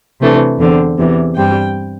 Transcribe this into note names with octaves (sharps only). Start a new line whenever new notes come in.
C3 E3 A3 D4
E2 D3 C4
E2 C3 E3
G2 G3 C4 G5